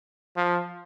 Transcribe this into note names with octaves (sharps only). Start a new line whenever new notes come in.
F3